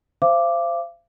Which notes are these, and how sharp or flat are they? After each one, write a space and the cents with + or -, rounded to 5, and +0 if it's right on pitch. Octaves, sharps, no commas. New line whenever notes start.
C5 +0 F5 -40 D6 +0